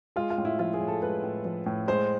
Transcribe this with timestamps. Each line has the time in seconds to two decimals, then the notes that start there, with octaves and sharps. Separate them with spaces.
0.16 G#3 F4
0.30 F4
0.38 A2
0.45 E4
0.59 F3 F4
0.74 G#4
0.80 A2
0.88 A4
1.02 G#3 B4
1.23 A2
1.45 F3
1.66 A2
1.88 G#3 C5